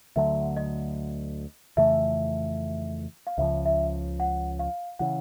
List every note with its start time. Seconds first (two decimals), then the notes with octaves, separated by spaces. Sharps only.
0.16 D2 D3 F#3 A3 E5
0.57 D#5
1.77 F2 C#3 E3 A3 E5
3.27 F5
3.38 C#2 C#3 F3 E5
3.65 E5
4.20 F#5
4.59 F5
4.99 C#3 E3 F#5